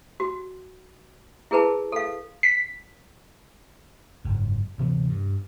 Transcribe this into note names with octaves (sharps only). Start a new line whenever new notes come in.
F#4
E4 G#4 A#4 B4 A5
A4 F5
B6
F#1 G#2
D2 C3 E3 B3
G2